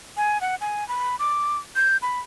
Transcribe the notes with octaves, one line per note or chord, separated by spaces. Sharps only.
G#5
F#5
G#5
B5
D6
G6
B5